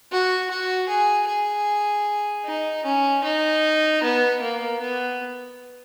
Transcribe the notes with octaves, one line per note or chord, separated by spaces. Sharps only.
F#4
F#4
G#4
G#4
D#4
C#4
D#4
B3
A#3
B3